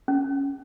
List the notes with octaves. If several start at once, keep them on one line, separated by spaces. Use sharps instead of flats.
C#4